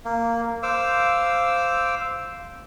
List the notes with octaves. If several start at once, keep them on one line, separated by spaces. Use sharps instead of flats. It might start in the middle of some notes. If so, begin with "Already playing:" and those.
A#3
C5 F5 D6 E6